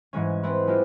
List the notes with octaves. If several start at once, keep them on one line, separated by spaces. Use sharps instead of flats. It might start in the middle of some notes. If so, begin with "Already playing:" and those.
G#2 E3 G#3 C#4
B3 C4 E4 B4
G#3 E4 F4 G4